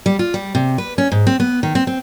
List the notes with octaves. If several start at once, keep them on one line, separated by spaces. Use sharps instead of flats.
G3
F4
G3
C3
B4
C#4
G#2
C4
B3
D#3
C4
C4